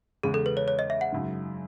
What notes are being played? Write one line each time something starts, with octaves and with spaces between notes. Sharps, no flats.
E2 C#3 G#3 G#4
A4
B4
C#5
C#5
D#5
E5
F#5
F#2 C#3 G#3 D#4